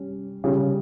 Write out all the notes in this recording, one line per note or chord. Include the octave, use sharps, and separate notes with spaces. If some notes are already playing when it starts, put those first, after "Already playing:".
Already playing: G3 C#4
C#3 G3 C#4 G4